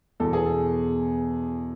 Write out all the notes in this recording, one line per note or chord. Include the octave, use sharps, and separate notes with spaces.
E2 B2 A4
G#4
A4